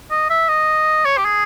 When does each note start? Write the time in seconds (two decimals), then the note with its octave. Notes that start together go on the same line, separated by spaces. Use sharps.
0.11 D#5
0.30 E5
0.49 D#5
1.05 C#5
1.18 G4
1.25 G#4